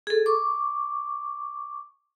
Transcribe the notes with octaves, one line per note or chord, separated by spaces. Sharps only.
G#4 A4
C#6 D6